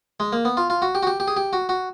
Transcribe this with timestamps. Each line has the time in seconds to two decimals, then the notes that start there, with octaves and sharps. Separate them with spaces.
0.20 G#3
0.33 A#3
0.45 B3
0.57 F4
0.70 F4
0.82 F#4
0.95 G4
1.03 F#4
1.07 G4
1.20 G4
1.28 G#4
1.37 G4
1.53 F#4
1.69 F#4